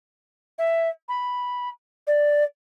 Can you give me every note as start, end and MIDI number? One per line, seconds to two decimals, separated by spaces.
0.58 0.89 76
1.09 1.69 83
2.07 2.44 74